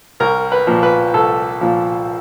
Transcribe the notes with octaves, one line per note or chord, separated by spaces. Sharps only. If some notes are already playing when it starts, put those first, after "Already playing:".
C2 A#4
B4
A#2 F3
B4
C2 A4
A#2 F3